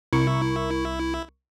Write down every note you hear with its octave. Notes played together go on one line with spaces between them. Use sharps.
C2 E4 A#4 C#6